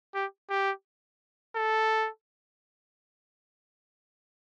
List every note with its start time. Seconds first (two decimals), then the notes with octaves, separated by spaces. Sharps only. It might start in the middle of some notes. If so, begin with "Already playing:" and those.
0.15 G4
0.50 G4
1.56 A4